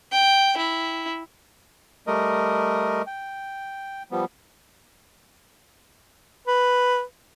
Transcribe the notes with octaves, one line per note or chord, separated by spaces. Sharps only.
G5
E4
G3 A3 A#4 D#5
G5
F3 G3 B3
B4